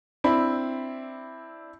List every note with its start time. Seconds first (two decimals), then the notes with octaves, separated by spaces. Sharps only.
0.24 C4 D4 E4 B5